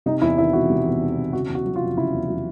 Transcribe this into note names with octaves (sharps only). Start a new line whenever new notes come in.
C3 D#4
E2 E4
D#3 E4
E1 F#4
C3
E2
D#3
E1
C#3 F#4
E2
F#4
F#3
F4
F1
C#3 E4
E2
F#3